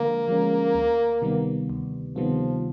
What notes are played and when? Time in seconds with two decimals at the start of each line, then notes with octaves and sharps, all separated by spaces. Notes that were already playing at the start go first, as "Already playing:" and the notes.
Already playing: D3 F3 G#3 A#3
0.28 F3 G#3 C#4
0.75 D2
1.22 C3 D#3 G3 B3
1.70 D2
2.16 C3 D#3 F3 G3 B3